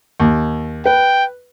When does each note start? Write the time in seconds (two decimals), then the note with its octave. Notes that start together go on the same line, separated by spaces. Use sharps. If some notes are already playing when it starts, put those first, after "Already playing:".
0.20 D#2
0.85 B4 G5